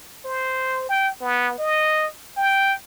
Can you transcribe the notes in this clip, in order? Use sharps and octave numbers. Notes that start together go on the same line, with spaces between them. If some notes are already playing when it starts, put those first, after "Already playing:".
C5
G5
B3
D#5
G5